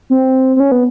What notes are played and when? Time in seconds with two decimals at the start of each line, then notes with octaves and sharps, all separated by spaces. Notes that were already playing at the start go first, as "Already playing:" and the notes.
0.10 C4
0.56 C4
0.60 C#4
0.72 B3